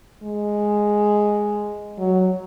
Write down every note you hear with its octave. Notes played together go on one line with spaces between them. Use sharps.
G#3
F#3